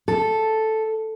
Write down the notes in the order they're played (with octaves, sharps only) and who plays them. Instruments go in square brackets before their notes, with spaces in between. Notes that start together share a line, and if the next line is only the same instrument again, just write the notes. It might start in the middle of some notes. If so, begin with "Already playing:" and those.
[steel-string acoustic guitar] A4